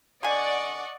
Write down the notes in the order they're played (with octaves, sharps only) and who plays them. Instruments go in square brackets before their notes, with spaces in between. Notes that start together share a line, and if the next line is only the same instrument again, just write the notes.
[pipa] D3 G#5 [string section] D5 F#5 [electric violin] D#5 C#6